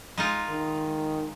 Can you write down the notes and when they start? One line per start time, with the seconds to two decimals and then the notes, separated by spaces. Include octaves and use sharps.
0.17 G#3 D#4 F4
0.49 D#3